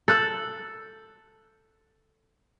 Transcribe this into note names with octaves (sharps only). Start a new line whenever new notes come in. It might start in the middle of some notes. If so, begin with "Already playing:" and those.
A4 E6 F#6 G6